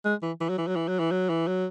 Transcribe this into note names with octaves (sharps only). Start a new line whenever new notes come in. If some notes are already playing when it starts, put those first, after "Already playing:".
G#3
E3
E3
F#3
E3
F#3
E3
F#3
E3
F#3
E3
F#3